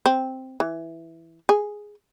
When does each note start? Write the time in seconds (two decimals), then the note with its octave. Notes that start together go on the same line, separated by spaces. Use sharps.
0.06 C4
0.60 E3
1.49 G#4